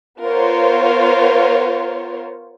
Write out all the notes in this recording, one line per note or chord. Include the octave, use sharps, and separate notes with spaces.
B3 F4 A#4 C5 C#5